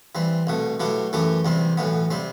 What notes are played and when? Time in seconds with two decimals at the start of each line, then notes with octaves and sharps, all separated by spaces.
0.15 E3 G3 C4
0.47 C2 B2 A3
0.80 B2 F#3 A3 E4 G4
1.13 F#2 E3 A3 E4 G4
1.45 E2 C3 G3 C4
1.77 B1 A2 E3 B3
2.11 C3 G3 C4